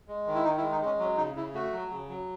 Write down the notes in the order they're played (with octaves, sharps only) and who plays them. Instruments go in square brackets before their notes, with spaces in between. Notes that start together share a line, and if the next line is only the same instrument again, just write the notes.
[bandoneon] G#3
D#3
E4
D#3 D#4
E4
G#3
D#4
G#3 C#4
F#3 C#4
C#3 D#4
C#3 E4
A3 F#4
F#3
C#3
F#3